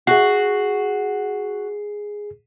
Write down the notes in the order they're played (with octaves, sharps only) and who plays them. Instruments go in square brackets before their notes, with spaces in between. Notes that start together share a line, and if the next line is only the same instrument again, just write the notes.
[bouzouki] F#4 [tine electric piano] G#4 C7